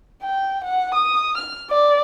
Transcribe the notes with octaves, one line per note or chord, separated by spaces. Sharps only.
G5
F#5
D#6
F6
D5